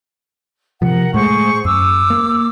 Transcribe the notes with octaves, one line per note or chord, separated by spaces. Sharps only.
C3 F3 A#4 F#5
A2 G#3 A3 G#4 C5 C#6
F#2 D6 E6
A#3